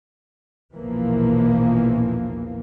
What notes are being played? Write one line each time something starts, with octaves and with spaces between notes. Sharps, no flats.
A#1 E2 B2 E3 F3 A#3